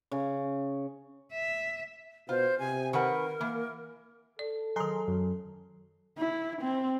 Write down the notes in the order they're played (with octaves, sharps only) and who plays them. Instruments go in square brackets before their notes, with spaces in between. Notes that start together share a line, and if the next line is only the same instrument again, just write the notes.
[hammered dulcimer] C#3
[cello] E5
[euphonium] B2 [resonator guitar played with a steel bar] F4 [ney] C5
[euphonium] C3 [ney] G#5
[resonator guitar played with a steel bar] D#3 B4 F#5 [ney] A#4
[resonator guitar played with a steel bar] E3 [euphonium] A#3
[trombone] A4 [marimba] D5
[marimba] D#3 F#3 [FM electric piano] G#4 A#4 C6
[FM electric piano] F#2
[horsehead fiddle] E4
C4